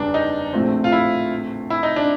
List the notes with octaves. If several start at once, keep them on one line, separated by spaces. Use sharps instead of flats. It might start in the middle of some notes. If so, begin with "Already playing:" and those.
Already playing: F#1 E2 G3 B3 D4
D#4
A#1 A2 F3 A3 C4
F4
E4
E4
D#4
D4